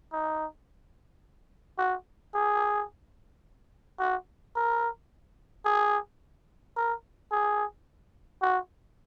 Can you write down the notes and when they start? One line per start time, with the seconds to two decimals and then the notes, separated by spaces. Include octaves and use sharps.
0.12 D#4
1.78 F#4
2.35 G#4
3.99 F#4
4.56 A#4
5.65 G#4
6.76 A#4
7.32 G#4
8.42 F#4